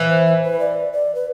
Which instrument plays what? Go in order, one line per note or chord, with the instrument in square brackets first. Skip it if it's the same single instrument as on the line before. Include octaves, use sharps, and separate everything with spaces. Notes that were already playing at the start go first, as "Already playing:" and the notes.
Already playing: [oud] E3
[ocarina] C5
C5
B4
D5
D5
B4